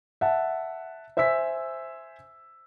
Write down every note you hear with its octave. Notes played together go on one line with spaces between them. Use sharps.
E5 F#5 A5
C5 E5 G#5 E6 B6